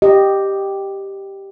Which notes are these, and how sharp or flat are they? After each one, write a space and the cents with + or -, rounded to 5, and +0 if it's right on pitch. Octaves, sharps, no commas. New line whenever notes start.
G4 +0 D#5 -10